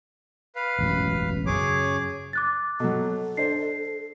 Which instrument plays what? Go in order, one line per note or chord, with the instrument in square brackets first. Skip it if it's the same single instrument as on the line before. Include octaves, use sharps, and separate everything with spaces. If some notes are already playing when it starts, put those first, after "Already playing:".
[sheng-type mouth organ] B4 F5
[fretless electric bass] E1 A1 F#2
[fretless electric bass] F#2 C#3 [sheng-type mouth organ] G#4 C#5 D6
[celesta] D6 F#6 A6
[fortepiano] B2 F#3 [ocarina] A4
[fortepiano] D4 C5 [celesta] C7